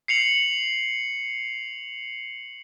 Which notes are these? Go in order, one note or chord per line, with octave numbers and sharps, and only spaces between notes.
C7 C#7 F7 F#7